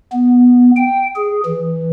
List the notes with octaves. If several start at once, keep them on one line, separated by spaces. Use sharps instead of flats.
B3
G5
G#4
E3